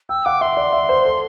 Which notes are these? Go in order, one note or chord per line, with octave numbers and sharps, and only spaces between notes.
G5 E6
F#5 D6
E5 C6
D5
E5
C5
A4